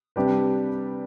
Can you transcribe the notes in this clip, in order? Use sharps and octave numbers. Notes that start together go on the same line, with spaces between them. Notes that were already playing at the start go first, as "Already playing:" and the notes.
C3 G3 D4 G4 B4